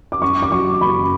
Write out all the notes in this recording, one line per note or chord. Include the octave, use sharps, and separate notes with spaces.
D6
F#2 C#6
D6
F#3 C#6
F#1 B5